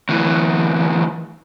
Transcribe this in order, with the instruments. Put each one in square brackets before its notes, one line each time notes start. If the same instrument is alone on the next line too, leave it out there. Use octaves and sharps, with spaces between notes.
[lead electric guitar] D2 E3